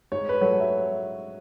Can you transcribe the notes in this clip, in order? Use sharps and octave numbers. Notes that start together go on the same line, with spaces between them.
G#2 C#5
B4
F#3 A3 C#5
E5